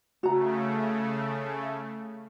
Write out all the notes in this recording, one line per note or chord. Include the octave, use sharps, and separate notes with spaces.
C#3 A3 F#4 A#5